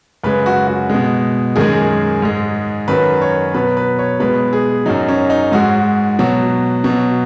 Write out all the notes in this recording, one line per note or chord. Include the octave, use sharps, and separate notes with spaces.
F#2 C#3 G#3 B4
F#4
F#4
B2 G#3
F#2 D#3 G#3 G#4
G#2 G#3
F#2 D#3 F#3 B4
C#5
B2 F#3 B4
B4
C#5
B2 G#3 B4
G#4
F#2 F#3 D#4
C#4
D#4
G#2 G#3 F#4
B2 F#3
B2
F#3